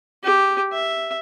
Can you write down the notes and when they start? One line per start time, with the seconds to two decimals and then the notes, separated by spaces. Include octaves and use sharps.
0.23 G4
0.73 E5